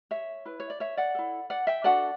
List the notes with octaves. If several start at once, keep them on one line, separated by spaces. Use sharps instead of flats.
C#5 E5
E4 B4
C#5
D5
C#5 E5
D5 F#5
E4 A4
D5 F#5
E5 G5
D4 F#4 A4 D5 F#5